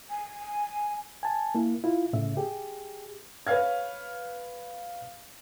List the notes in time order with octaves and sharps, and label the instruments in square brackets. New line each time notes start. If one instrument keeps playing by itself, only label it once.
[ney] G#5
[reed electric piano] G#5 A5
A#3 E4
E4 F4
A2 C#3 E5
G4 G#4
[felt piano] B4 C#5 F5 F6 G#6